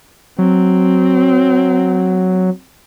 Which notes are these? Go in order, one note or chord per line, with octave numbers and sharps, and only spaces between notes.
F#3 C4